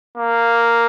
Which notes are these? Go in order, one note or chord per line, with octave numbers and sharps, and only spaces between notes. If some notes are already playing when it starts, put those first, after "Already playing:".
A#3